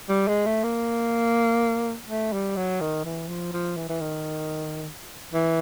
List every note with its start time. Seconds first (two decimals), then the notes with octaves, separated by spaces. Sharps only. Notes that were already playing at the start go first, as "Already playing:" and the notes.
0.09 G3
0.28 G#3
0.46 A3
0.64 A#3
2.08 A3
2.33 G3
2.56 F#3
2.81 D#3
3.05 E3
3.28 F3
3.53 F3
3.77 E3
3.89 E3
4.01 D#3
5.33 E3